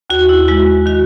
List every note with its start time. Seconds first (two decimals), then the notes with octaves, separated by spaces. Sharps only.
0.10 D#2 F#4
0.29 E4
0.48 G#3 F#4
0.86 D#3 F#4